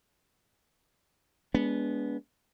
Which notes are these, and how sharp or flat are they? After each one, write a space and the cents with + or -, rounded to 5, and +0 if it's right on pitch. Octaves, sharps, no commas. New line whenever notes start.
G#3 +0 B3 -15 D4 -30